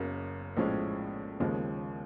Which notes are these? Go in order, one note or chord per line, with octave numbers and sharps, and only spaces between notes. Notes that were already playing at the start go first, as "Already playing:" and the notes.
Already playing: F#1 F#2 C#3
A#1 A2 F3 G#3 C#4
D#2 C#3 F3 G#3